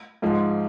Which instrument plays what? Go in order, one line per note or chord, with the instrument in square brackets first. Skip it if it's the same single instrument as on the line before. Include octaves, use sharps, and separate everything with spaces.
[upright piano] G#2 F3 G#3